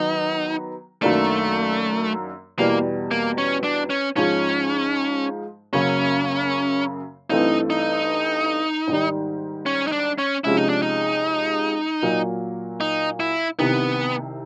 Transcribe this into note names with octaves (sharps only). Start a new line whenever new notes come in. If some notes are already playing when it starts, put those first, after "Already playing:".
Already playing: D#3 F#3 B3 D#4
F#2 D#3 F#3 A3 A#3 D4
E2 B2 G3 A#3
A#3
C#4
D4
C#4
G#2 F3 G#3 C#4
F#2 C#3 F#3 A#3 C#4
G2 E3 A3 C4 D#4
D#4
G#2 D#3 G3
C#4
D#4
D4
C#4
C3 F3 G#3 C#4 E4
D#4
D4
D#4
A#2 F#3 A#3
D#4
E4
C2 C3 D#3 B3